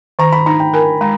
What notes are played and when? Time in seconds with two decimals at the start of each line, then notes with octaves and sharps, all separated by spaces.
0.19 D#3 A#5
0.32 B5
0.46 D#4 A#5
0.60 G5
0.73 A#4 G#5
1.01 G#3 A#5